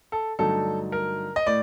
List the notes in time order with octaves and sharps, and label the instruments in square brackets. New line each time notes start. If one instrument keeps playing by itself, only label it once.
[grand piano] A4
G2 D3 F#3 A3 D#4 A4
A#4
D#5
A2 D5